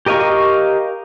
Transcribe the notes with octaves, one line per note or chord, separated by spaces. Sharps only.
G4 A#4 D#5 F5 C#6